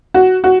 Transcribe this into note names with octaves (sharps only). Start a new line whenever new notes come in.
F#4
F#4